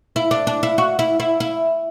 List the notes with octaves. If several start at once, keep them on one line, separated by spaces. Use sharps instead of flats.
E4
D4
D4
E4
F#4
E4
E4
E4